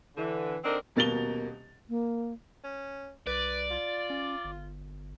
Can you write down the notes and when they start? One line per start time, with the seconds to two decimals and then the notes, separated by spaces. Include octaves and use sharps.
0.16 D3 E3
0.64 D3 C4 D4 D#4 A#4 C5
0.96 D#1 B2 A#3 A6 F7 G7
1.89 A#3
2.64 C#4
3.27 C2 B4 D5
3.71 F4
4.10 C#4
4.45 G1